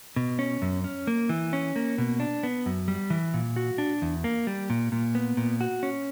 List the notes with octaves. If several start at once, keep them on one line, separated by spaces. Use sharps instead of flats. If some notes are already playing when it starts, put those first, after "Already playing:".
B2
C#4
F#2
C#4
A#3
E3
C#4
A#3
B2
D4
B3
F#2
G3
E3
A#2
F#4
D4
E2
A#3
G3
A#2
A#2
B3
A#2
F#4
C#4